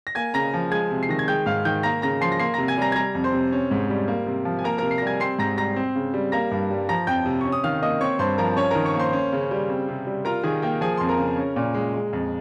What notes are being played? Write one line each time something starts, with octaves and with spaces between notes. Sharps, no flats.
A#6
A#3 G#5 G#6
C#3 A#5 A#6
F3
G#3 G#5 G#6
C3
C7
D#3 A#6
G#6
G#3 G5 G6
G#2 F5 F6
D#3 G5 G6
A#3 A#5 A#6
C#3 A#5 A#6
F3 C6 C7
A#6
A#3 C6 C7
C3 A#5 A#6
G#5 G#6
G3 A#5 A#6
G#6
G3 A#5 A#6
F2
C5 C6
C3
C#4
G#2
G3
A#3
C3
F3
G#5
A#3 A#4 A#5
C3 A#4 A#5
C7
A#6
G3 G#5 G#6
C4 C6 C7
G#2 A#5 A#6
G3 A#5 A#6
C4
C#3
G3
A#3 A#5 A#6
G2
G3
F3 A#5 A#6
F2 G5 G6
C3
C#4 C#6
D#6
D#3 F5 F6
A#3 D#5 D#6
C4 C#5 C#6
G2 C5 C6
F3 A#4 A#5
C#4 C#5 C#6
D#3 A#4 A#5
C#5 C#6
A#3
C5 C6
C#4
C#3
G3
C4
C3
G3
F4 A#4 A#5
D#3 G#4 G#5
A#3 G5
F3 G#4 G#5
F2 C6
A#4 A#5
C#3
C#4
A#2
G#3
G#3
F2